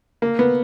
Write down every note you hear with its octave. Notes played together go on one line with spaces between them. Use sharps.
A#3
B3